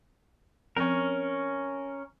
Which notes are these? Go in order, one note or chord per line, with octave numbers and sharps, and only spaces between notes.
F3 C4 C#4 A#4 G5